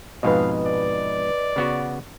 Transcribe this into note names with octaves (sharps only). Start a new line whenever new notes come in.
F2 G#2 B2 B4 D#5 F5
D5
C#3 B3 F#4